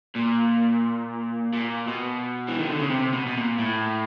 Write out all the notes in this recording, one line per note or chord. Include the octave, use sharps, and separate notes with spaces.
A#2
A#2
B2
E3
D#3
D3
C#3
C3
B2
B2
A#2
A2